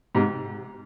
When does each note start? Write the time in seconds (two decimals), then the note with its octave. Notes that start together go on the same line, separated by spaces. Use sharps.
0.15 G#2 C3